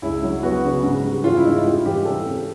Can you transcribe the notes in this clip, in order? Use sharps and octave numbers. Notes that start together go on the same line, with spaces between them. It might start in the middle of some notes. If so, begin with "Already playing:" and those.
C#2 E4
F#3
B3 F#4
C#3
G#2
G3
E3 F4
E4
G#2 D#4
G3 F4
E3 G4
C3 A4
C3